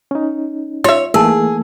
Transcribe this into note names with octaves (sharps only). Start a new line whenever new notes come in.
C#4 D#4
F4 C#5 E5
E3 A3 A#3 D#4 G#4 A5 E6